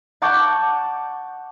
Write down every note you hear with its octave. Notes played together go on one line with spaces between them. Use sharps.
F#5 A5 C#6 D6 F#6 G6